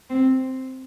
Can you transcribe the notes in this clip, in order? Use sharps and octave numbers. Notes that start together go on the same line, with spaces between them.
C4